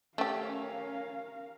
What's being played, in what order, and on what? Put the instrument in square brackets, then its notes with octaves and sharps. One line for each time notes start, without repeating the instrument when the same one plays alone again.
[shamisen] A3 G4 [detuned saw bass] C#4 [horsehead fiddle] A#4 F5